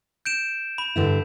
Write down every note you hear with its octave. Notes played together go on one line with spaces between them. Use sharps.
G6 D7 E7
B5
G2 D3 E4